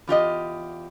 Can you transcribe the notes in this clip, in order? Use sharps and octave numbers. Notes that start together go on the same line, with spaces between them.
E2 F4 G4 D#5